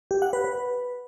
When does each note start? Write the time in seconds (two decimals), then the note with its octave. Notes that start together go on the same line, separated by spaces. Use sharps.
0.11 G4
0.22 F#5
0.33 B4
0.44 B4